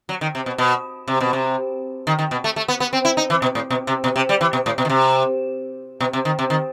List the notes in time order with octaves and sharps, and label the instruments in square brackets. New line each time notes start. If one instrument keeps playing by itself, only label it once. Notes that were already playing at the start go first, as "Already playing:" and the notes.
[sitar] F#3
D#3
C3
B2
B2
C3
B2
C3
D#3
D#3
B2
A3
A3
B3
B3
C4
E4
D#4
E3
B2
A2
B2
C3
B2
C3
G3
E3
B2
A2
B2
D#3
C3
B2
C3
D#3
C3
D#3